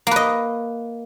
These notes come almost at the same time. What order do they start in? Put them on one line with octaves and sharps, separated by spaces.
A#3 B4 D#5